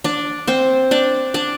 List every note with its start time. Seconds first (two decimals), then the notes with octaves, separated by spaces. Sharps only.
0.04 D4 D5
0.47 C4 C5
0.91 D4 D5
1.34 D4 D5